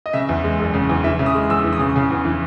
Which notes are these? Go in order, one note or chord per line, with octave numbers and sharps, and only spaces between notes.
D#5
C#3 E5
E2
G#3
F#1
C#3
E2
E3 E5
C#3
D#6
G#3
E2 E6
E3
D#6
C#3
C#3
E2
E3